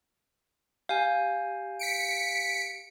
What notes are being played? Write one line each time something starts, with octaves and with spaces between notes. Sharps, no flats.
G4 F5 G#5
B6 C#7 D7